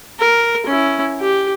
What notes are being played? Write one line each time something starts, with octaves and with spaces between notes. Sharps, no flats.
A#4
C#4 E4
G4